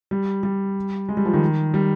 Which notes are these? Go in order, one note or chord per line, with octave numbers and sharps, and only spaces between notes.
G3
G3
G#3
G3
F3
D#3
G3